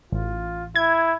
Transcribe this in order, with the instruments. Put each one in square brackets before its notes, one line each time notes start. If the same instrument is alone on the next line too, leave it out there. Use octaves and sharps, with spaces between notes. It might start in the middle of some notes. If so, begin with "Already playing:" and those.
[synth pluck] A1 [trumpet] F4
[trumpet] E4 [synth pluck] G#6